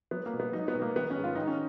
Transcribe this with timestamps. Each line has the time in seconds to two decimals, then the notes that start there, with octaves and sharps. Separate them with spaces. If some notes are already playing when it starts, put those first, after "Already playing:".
0.11 F#3 B3
0.26 A#3
0.33 B2
0.40 B3
0.53 F#3 D#4
0.68 B3
0.75 B2
0.82 A#3
0.96 D#3 B3
1.10 C#4
1.17 G#2
1.24 F4
1.35 D#3 D#4
1.48 C#4